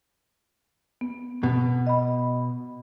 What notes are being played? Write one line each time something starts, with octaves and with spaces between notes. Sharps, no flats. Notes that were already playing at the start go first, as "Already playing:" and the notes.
B3
B2
D#5 B5